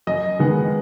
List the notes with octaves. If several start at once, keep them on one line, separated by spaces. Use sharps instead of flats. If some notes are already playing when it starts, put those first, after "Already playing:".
F#2 D#5
D#3 G#3 B3